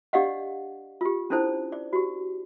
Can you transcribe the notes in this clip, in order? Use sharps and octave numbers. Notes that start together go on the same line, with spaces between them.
D4 G4 D5 D#5 F5 F#5
F4 G4
C#4 D4 E4 A4 C5 A5
D5
F#4 G4